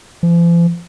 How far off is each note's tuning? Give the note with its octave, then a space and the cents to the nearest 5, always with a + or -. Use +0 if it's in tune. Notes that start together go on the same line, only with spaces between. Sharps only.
F3 -45